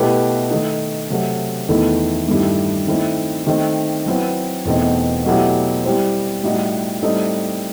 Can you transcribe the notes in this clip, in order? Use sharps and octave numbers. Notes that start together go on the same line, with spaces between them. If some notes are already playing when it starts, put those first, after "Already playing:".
Already playing: B2 A3 E4 G4 B4
D#3 A3 D#4
C3 F#3 A3
E2 D#3 A3 E4 A4
G2 D#3 A3 E4 G4
D#3 A3 C4 E4
D#3 A3 C4
F#3 C4 E4 B4
E2 B2 A3 C4 D#4
B2 F#3 A3 E4 G4
G3 C4 E4 G4 C5
A2 G3 D#4 F#4
A2 G3 C4 D#4 A4